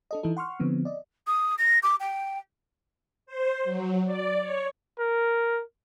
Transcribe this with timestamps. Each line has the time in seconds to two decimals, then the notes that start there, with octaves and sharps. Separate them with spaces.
0.11 D4 A4 D#5
0.23 E3 D#4 E4 A4
0.37 F#5 C6 C#6 F6
0.60 D3 F3 B3 C4
0.85 D5 D#5
1.27 D#6
1.58 A#6
1.82 D6
2.00 G5
3.26 C5
3.64 F#3
4.05 D5
4.40 C#5
4.99 A#4